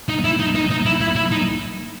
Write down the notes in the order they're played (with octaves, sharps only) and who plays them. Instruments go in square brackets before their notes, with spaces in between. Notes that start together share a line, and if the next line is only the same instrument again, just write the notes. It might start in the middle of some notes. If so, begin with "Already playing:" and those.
[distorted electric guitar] D#4
E4
D#4
D#4
D#4
E4
E4
E4
D#4